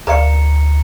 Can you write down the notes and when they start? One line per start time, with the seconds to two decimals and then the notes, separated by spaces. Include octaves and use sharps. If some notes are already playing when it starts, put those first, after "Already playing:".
0.07 D2 A#4 D5 F5 A#5 C#7